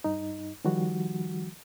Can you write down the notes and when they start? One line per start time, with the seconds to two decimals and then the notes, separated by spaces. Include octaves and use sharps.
0.04 G2 D#4
0.65 D#3 F3 G3 F#4